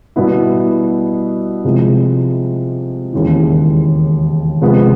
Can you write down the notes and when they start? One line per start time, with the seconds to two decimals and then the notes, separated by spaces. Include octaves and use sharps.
0.16 B2 G3 B3 E4
1.65 C3 F3 G#3
3.13 E1 D#2 C#3 E3
4.62 C3 F3 G#3 B3